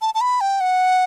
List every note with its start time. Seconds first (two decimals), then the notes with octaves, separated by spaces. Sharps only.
0.01 A5
0.15 A5
0.21 B5
0.41 G5
0.60 F#5